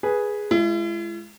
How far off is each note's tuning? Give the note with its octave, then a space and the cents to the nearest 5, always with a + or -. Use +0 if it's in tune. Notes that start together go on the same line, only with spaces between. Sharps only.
G#4 +0 B4 -10
G#3 +15 E4 +45